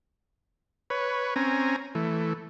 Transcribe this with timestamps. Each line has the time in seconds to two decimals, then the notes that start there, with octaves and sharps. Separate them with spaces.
0.90 B4 C#5
1.36 C4 C#4 G#5 A#5
1.95 E3 A3